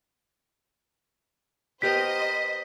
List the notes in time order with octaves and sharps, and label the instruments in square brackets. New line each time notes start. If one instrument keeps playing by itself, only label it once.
[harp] B3 G4 A#4 [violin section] C5 D#5 [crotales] B6